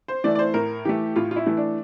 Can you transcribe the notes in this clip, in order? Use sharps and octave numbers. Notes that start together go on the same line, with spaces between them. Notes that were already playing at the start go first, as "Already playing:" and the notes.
C5
E3 A3 D5
D5
C5
A2 A#4
E3 A3 G4
A2 F4
F4
E4
E3 A3
D4